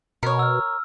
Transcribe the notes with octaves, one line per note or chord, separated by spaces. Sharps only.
B2 A#4 C#5
E6 F6